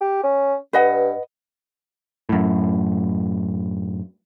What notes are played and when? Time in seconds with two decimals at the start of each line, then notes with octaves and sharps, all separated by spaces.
0.01 G4
0.23 C#4
0.73 G2 B4 D#5 F#5
2.29 F#2 A2